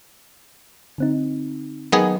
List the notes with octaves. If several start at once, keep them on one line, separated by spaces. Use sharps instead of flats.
D3 C4 D#4
D#3 F#3 B3 G#4